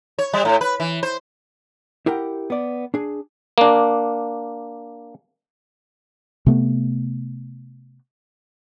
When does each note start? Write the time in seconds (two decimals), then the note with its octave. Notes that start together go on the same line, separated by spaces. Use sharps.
0.19 C#5
0.33 G3
0.45 A2
0.61 B4
0.80 E3
1.03 C5
2.06 E4 G4 A#4 F#5 G5
2.50 B3 D5
2.94 D4 G#4
3.58 A#3 D4
6.46 C3 A3 B3